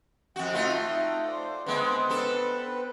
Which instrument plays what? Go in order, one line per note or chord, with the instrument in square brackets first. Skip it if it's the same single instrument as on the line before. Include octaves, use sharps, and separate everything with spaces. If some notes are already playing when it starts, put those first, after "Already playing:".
[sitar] F2 F#4 [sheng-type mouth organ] F#5 G5
[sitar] A3 D#4 F4
[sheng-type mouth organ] C5 D5
[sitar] D3 G#3 [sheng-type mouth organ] B3 C4 B4
[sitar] D4 A4